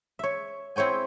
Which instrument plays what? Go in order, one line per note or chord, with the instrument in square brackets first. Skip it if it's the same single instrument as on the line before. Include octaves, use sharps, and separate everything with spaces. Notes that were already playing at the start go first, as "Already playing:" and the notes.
[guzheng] C#5 E5
C4 E4 C#5 G5 G#5